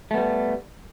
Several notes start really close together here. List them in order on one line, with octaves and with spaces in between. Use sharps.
A3 B3 G3